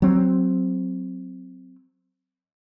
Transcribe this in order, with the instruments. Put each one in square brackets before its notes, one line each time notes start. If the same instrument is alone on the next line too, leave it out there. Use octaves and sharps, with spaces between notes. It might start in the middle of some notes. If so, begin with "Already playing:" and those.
[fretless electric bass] F#3 C4